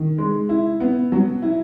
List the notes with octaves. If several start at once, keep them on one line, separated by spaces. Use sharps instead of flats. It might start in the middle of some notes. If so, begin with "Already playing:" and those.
Already playing: D#3
G#3
E4
B3
F#3
E4